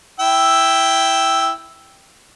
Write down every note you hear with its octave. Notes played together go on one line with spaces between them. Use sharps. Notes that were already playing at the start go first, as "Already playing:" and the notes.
E4 G5 E6